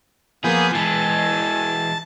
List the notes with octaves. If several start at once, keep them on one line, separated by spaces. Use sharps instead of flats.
F3 A#3 B3 G#4 G#5 G6
E3 G#3 G#5 A5